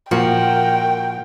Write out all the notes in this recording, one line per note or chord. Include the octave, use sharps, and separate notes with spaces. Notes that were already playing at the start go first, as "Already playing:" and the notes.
A#2 F3 F#4 A#4 G5